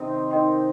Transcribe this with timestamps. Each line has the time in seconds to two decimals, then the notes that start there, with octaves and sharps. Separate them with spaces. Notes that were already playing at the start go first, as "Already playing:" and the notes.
Already playing: C3 D#3 C4 D#4
0.31 D#4 A#4 D#5 G5 C6